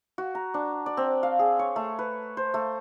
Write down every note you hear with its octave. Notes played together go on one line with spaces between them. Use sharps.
F#4
A#5
D4
D5
C4
F5
G#4
C#5
A3
B4
C5
A3